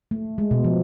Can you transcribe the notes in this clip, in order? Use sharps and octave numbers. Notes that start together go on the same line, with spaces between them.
A3
G#3
B2
F3